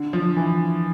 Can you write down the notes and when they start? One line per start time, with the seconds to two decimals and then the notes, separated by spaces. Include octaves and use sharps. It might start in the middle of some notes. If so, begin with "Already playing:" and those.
Already playing: D3
0.13 F3
0.37 E3